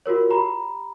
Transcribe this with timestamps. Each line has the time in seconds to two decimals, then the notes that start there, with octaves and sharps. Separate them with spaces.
0.06 F4 F#4 A#4 C#5
0.30 G4 A#5 B5